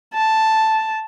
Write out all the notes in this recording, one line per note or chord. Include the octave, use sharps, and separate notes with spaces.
A5